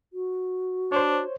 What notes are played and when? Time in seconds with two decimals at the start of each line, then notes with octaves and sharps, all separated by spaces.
0.13 F#4
0.92 D4 C5 C#5